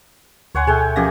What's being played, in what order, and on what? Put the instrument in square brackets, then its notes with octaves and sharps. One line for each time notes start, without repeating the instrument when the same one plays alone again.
[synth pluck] D2 C6 [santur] C#5 F#5 G#5
[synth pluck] B2 G#4 A4 [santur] E5 G5 G#5
[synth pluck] F3 C#4 A#6 [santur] A#3 G4 G#4